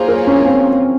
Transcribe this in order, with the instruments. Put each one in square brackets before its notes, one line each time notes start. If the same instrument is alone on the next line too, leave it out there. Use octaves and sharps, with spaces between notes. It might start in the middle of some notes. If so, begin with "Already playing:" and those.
Already playing: [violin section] A#3 F4 G#4 C#5 [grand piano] C5
[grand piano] A#4
C#4
C#4
C4